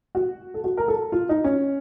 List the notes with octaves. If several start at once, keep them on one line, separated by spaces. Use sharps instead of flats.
F#4
A4
F#4
A#4
A4
F4
D#4
C#4